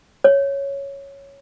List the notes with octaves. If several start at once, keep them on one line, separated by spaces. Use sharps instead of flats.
C#5